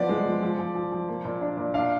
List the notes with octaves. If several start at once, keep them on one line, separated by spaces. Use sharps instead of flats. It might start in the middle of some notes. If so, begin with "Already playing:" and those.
Already playing: F3 B3 D5
G#3
F3
F3
F3
F3
F3
A#3
A#2
D4
A#2
D4 F5